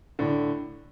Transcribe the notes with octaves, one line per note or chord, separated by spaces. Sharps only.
A2 D3